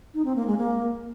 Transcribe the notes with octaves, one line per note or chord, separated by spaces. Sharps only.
D#4
C4
A#3
G#3
A#3